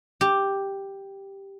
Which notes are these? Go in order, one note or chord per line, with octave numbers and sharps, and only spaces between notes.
G4